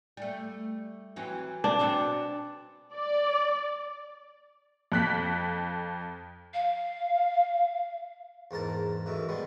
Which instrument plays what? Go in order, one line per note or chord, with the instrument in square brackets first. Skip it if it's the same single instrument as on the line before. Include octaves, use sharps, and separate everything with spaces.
[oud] G3 A3
E3 F#3 C4
[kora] D4
[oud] B2 F#3 C4
[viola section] D5
[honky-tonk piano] F2 F#6 B6
[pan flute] F5
[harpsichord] E2 G#2 A#4 A5
F#2 A2 D#3 E3
G3 G#3 B3